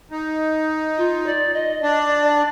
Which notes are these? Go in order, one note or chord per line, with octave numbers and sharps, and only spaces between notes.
D#4
F4
D5
D#5
D4 D5